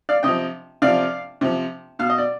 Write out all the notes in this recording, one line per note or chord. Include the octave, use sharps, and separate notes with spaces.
D5 F5
C3 F3 D#5 G5
C3 F3 D5 F5
C3 F3
B2 F5
D#5
D5